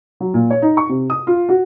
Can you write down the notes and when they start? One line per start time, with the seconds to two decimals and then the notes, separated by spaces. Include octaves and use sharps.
0.20 F#3
0.34 A#2
0.50 C#5
0.62 D#4
0.77 C#6
0.89 C3
1.10 D#6
1.27 F4
1.49 F#4